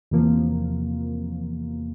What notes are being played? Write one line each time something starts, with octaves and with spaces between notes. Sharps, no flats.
E2 C3 F3 A#3